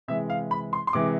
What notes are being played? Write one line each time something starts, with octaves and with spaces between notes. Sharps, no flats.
C3 E3 G#3 E5
F5
B5
C6
C6
C3 E3 G#3 D6